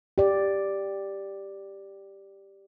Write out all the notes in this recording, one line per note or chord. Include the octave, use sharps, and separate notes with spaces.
G4 D5